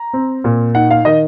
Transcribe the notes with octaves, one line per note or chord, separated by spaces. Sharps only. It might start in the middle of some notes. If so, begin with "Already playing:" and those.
Already playing: A#5
C4
A#2
D#4 F#5
F5
D#3 D#5